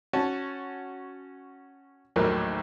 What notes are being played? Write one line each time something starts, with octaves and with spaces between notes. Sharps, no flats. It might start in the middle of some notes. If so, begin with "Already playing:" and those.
C#4 F#4 A5
A#1 D#2 A2 F#3 A#3